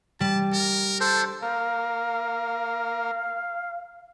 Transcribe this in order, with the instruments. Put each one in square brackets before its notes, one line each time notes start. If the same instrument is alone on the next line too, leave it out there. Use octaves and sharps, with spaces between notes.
[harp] G3 [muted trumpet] A5
[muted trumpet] A#4
[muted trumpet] D4 [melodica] A4 C5
[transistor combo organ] A#3 A#4 [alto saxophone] F5